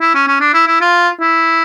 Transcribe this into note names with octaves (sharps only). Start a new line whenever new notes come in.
E4
C#4
C#4
D4
E4
E4
F4
E4